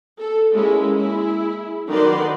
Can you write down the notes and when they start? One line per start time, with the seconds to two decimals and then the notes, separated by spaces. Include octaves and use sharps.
0.19 A4
0.51 G#3 A#3 C#4 E4
0.95 E4 G#4
1.88 D#3 F#3 B4 D5 F#5 C6